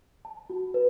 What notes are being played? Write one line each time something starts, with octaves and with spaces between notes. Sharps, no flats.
A5
F#4
B4